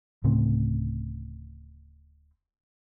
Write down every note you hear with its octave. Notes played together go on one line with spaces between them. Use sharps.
D1 A2 C#3 C4